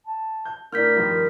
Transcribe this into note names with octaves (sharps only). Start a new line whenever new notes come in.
A5
G6
A2 D4 A#4 F6 G6 B6
G2 D#3 F3